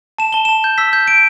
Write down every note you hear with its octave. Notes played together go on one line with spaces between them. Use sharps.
A5 E7
A5 G7
A5 E7
G6
E6 B6
G6
G6 D7